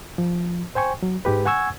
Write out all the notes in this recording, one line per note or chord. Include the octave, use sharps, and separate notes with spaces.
F3
C5 G5 G#5 C#6
F#3
G#2 G#3 G4 B4
F#5 G#5 C#6 E6 G#6